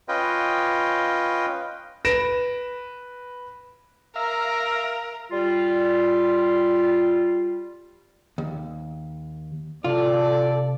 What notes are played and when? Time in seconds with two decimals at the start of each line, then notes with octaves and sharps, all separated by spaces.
0.08 C#4 F4 B4 D#5 G5
2.05 B4 A#6 D7 E7
4.16 A#4 E5 F5 A#5
5.30 G3 F4
8.38 D#2
9.84 C3 F4 A4 D5